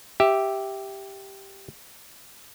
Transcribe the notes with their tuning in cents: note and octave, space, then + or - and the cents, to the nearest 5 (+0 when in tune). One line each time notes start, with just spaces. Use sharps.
G4 +0 E5 +0